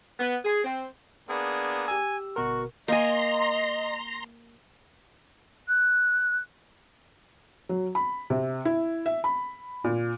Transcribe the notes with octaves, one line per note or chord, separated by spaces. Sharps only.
B3
G#4
C4
A#3 B3 D4 G#4
G4 G#5 E6
G1 B2 F#4 A#4 C#6
A#3 D#5 G#5 A#5 C6
F#6
F#3
B5
C3
E4
E5
B5
A#2